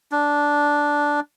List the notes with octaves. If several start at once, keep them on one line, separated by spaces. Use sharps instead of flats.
D4